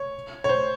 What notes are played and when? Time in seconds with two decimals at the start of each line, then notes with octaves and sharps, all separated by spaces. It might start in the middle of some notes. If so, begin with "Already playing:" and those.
Already playing: C#5
0.44 C#5
0.49 C5